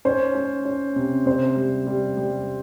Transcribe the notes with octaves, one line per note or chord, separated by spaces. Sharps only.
C#4 C5
C#4
C#4
C3
C3 C5
G3
G3
G3